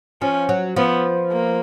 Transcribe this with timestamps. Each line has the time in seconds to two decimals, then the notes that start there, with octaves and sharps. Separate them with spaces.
0.22 F3 C#4
0.49 F#3
0.76 F3 B3
1.32 A#3